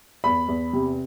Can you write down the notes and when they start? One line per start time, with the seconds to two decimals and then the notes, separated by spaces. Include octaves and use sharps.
0.24 E2 B5
0.48 E2
0.73 C3